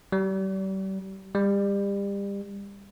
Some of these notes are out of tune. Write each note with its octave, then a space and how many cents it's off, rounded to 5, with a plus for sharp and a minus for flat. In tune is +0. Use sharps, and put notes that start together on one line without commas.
G3 -35
G3 +30